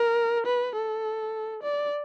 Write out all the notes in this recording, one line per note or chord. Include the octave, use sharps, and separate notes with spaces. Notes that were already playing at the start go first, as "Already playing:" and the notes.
Already playing: A#4
B4
A4
D5